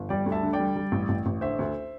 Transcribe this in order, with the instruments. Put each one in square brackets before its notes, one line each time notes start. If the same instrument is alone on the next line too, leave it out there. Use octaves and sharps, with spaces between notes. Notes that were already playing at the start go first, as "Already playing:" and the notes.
Already playing: [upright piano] G1
G3 D5 G5
D2
E5 A5
D3
D5 G5
G3
G3
A1
A1
A1
D3 C5 E5
D2